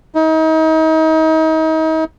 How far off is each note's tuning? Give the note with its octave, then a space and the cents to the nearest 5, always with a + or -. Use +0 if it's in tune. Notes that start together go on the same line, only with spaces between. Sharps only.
D#4 +35